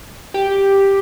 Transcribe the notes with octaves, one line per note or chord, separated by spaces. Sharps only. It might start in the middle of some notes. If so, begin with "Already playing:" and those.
G4